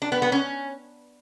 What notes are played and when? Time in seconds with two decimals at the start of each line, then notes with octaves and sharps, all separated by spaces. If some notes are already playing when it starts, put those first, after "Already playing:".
0.02 D4
0.12 B3
0.22 B3
0.32 C#4